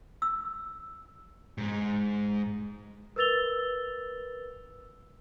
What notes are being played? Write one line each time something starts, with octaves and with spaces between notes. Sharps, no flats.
E6
G#2 G#3
A#4 B4 E6 A6 F7 G7